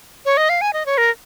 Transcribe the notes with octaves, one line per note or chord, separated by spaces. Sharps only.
C#5
D#5
F5
G#5
D#5
C#5
A#4